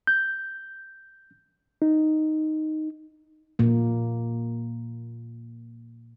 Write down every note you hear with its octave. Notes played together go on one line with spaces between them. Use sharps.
G6
D#4
A#2 A#3